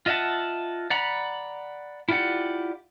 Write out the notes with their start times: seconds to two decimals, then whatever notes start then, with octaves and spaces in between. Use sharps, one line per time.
0.06 F4 D#5 E5 F#5 A5
0.90 D5 F#5 A#5 B5
2.09 E4 F4 G4 D5 F#5